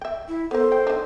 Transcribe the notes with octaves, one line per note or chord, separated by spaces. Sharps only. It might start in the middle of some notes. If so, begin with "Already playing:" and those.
E5 G5
E4
B3 A4 A#4 C5
G5
D4 D#4